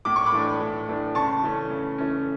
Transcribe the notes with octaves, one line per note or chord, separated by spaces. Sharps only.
A2 D6
C#6
B5 D6
E3 A3 D4
A2
E3 A3 D4
C#3 A5 C#6
E3 A3 C#4
C#3
E3 A3 C#4